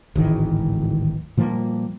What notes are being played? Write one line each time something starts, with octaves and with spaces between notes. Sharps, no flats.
D1 G#1 D#3 E3
A#2 F3 G3 A#3